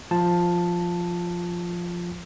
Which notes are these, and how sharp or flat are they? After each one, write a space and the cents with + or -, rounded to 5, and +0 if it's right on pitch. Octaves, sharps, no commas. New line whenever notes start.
F3 +0 F4 +0 A5 +0